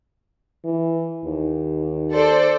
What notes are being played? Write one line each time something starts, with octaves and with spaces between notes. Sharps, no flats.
E3
D#2
A4 C5 D5